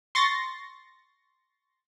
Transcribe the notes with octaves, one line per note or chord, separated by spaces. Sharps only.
C6 C#6 A6 A#6